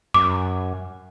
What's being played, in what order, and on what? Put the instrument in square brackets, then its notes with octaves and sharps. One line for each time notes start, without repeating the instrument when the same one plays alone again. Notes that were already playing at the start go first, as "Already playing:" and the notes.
[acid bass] F#2 [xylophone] D6